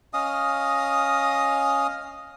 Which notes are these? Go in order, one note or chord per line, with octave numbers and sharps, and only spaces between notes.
C#4 D#5 F5 D#6